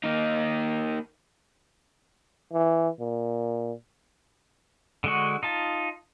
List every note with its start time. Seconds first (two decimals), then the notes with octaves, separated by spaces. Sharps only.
0.04 A#3 D#4
2.53 E3
3.00 A#2
5.04 D3 G#3 F#4
5.43 D#4 F4 A5